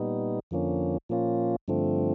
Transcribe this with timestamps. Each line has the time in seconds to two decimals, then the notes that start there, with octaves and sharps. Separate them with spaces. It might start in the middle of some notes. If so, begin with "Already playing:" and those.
Already playing: A#2 G3 B3 D#4
0.51 F2 D3 F3 A#3 C#4
1.09 A#2 F3 A#3 C#4 F4
1.68 G2 D3 F3 A3 C4